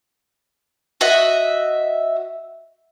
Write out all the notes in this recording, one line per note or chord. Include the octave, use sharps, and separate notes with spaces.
F#4 D#5 E5